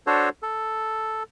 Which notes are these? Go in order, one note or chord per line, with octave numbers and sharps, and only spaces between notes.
D4 F#4 A4 C5 C#5
A4